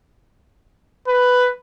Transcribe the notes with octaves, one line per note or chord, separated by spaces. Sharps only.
B4